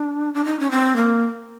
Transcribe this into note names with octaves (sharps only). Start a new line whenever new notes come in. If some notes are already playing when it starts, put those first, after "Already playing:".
Already playing: D4
D4
D#4
C#4
C4
A#3